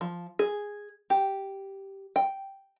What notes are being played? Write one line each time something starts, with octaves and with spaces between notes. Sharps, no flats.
F3
G#4
G4
G5